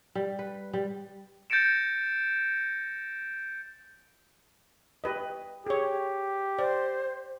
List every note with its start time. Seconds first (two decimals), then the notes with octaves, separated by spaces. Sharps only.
0.15 G3
0.39 B4
0.73 G3
1.50 G6 A6 A#6 C#7 D7 E7
5.04 G4 B4 D#5
5.67 G4 G#4 C#5
6.59 C5 D5